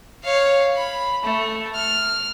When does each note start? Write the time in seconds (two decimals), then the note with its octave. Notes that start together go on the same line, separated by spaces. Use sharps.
0.24 C#5 F5
0.76 B5
1.24 A3
1.74 F6